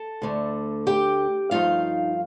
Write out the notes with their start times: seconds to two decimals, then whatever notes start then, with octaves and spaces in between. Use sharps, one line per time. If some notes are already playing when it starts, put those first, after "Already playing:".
Already playing: A4 A5
0.22 D2 D3 A3
0.87 G4 G5
1.51 G2 F3 A3 D#4 F4 F5